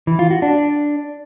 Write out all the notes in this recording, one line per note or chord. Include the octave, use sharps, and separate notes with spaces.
E3
F4
F#4
D4